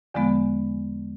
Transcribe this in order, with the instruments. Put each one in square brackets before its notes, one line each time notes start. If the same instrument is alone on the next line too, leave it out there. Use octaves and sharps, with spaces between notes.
[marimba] E2 D3 F3 G#3 B3